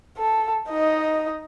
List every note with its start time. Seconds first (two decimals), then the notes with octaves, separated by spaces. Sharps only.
0.18 A4
0.69 D#4 D#5